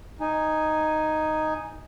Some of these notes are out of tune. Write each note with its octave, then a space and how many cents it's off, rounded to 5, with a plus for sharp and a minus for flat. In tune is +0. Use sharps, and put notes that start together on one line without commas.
D#4 +0 G#5 +0